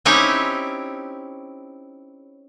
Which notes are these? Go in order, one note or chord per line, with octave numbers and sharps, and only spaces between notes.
C4 C#4 D#4 E4 G4 C#5